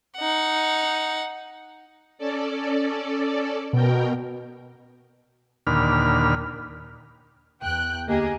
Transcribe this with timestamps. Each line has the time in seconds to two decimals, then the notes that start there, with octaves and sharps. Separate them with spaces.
0.17 D#4 F#5
2.18 C#4 A4 D5
3.73 B2 A#4 G5
5.67 D#2 A#2 D3 B5 F6
7.61 E2 G5 F#6
8.07 D2 A#3 G4 G#4 D#5